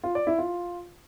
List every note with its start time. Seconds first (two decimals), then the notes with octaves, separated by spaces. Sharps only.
0.04 F4
0.15 D5
0.27 E4
0.38 F4